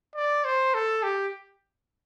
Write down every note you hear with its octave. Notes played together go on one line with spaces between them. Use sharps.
D5
C5
A4
G4